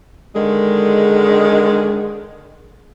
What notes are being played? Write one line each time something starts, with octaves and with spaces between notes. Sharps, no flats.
D3 D#3 G#3